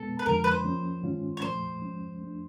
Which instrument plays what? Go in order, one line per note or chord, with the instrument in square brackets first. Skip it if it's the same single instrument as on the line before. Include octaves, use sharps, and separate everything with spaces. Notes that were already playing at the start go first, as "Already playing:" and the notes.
Already playing: [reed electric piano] B2 G#3 B3 [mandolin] A4
[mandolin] B4
[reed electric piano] F2 D3 F3 G#3 [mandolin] A#4
[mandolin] B4
C5
[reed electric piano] F3 A#3 C#4
G2 D#3 G#3 C#4 F4
[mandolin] C#5
[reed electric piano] A#2 F3 A3 [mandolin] C5
[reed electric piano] F3 G#3 C#4
F3 A3 D4